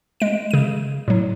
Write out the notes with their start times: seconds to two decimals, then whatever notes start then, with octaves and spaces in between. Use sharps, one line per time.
0.20 G#3 D7
0.51 C#3 D#7
1.08 A2 F#3